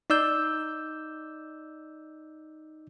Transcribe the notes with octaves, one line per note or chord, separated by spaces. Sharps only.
D#4 D5 E6 G6